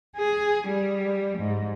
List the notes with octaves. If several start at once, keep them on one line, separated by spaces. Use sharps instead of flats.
G#4
G3
G#2